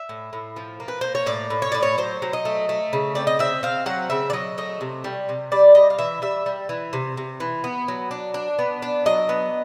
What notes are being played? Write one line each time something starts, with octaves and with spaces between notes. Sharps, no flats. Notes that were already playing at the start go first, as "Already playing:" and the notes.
Already playing: E5
A2
A2
F3
A#3
B4
A#3 C5
C#5
A2 D5
A2
C#5
A2 D5
C#5
F#3 C5
F#3
D#5
A3
A3
C#3
C4 D5
D#5
C4 E5
C4 F5
F#3 F#5
C#3 E5
D5
F#3 D#5
A3 D#5
C3
G3
C3
G3 D5
G3 D#5
F5
E3 E5
G3 E5
G3
E3
C3
C3
E3
B3
F#3
D4
D4
B3
D4
F#3 D#5
B3